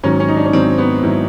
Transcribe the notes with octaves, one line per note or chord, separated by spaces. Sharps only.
G#2 D#3 F#3 C#4
C#4
D#4
D4
C#4
G#2 D#3 F#3 C4
B3
G#2 D#3 F#3 E4